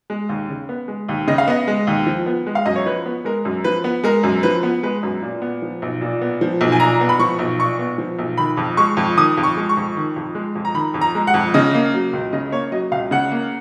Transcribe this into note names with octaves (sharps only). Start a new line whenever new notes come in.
G#3
D#2
C#3
B3
G#3
D#2
C#3 D#5
F5
B3 D#5
G#3
D#2
F3
B3
G#3
F5
F#2 D#5
C#5
F3 B4
B3
G#3 A#4
F#2
F3 B4
B3
G#3 A#4
F#2
F3 B4
B3
G#3 B4
F#2
A#2
B3
F3
B1
A#2
B3
F3
B1
G#5
A#2 A#5
B3
B5
F3 C#6
B1
A#2 C#6
B3
F3
B1
D#3 B5
F2
G#3 C#6
F2
D#3 D#6
F2
C#6
G#3
C#6
F2
D#3
F2
G#3
F2
A#5
D#3 B5
F2
A#5
G#3
F#5
F2
C#3 D#5
A#3
F#3
C#2
C#3 D#5
A#3 C#5
F#3 D#5
C#2 F5
C#3 F#5
A#3